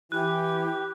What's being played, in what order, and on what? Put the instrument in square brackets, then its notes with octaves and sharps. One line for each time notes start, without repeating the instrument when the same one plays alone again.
[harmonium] E3 [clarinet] E4 [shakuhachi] G4 [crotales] F#6